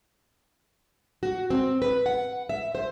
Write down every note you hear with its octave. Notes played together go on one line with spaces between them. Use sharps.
F#4
C4
B4
F#5
E5
C5